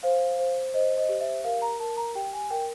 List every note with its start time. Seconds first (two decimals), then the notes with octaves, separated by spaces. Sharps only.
0.03 C5 F5
0.39 C5
0.74 C5 D#5
0.98 D#5
1.09 G4
1.21 E5
1.44 A#4 F5
1.62 A#5
1.80 A#4 A5
1.97 A#5
2.15 G4 G5
2.33 G#5
2.50 A#4 G5